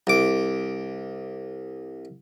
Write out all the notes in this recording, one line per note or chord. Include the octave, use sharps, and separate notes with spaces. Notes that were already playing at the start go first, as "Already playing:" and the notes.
C2 D6